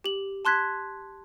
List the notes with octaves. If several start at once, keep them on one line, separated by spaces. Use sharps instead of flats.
G4 F#7
A5 C6 F#6 G#6 B6